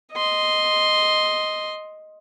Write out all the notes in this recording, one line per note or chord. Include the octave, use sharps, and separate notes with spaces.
D#5 C6